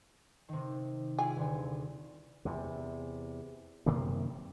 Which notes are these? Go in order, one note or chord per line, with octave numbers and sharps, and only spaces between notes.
C3 D#3
E4 F4 G#4 G#5
D#1 D3
E2 C3
F#2 C3 D#3 A#3